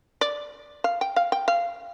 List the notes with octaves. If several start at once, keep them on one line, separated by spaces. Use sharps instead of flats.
D5
F5
G5
F5
G5
F5